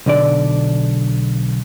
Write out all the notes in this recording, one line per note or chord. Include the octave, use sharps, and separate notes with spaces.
B1 D3 D5